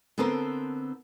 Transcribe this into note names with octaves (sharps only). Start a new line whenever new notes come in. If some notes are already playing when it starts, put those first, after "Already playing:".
D3 B3 C4 A4 A#4 C5